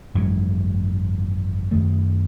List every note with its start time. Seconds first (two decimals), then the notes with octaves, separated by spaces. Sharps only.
0.14 G#1 F#2 E3 G#3
1.71 F#2 D#3 A3